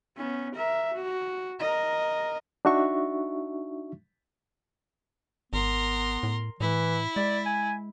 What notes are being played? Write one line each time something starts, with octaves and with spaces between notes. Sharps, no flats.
B3 C#4
A#4 E5
F#4
A#4 D#5
D4 D#4 F#4 E5 C#6
G#1 B3 A#4 C6
A2
A2 E3 E4
G#3 D5
G#5